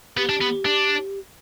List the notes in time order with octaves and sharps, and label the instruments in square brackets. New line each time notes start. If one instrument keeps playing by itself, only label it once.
[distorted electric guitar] B3 [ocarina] G4
[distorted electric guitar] D4
B3
D4